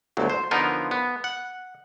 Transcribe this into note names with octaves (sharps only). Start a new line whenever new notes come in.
G1 D2 F#3
C5
D3 F3 B3 D#4 F4 A#4
B3
F#5